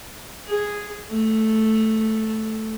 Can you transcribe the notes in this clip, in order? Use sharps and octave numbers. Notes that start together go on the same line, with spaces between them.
G#4
A3